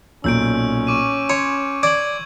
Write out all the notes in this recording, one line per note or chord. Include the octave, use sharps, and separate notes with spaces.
B1 A#2 C#4 E6 G6 D7
C#6 D6 D#7
C#5 C6
D5 G#6 F#7